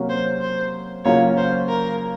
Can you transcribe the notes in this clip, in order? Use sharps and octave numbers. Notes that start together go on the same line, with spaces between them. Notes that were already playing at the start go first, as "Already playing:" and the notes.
Already playing: C3 F#3 A#3 C#4 F#4
C5
C5
C#3 F#3 A#3 C#4 F4 C#5
C5
A#4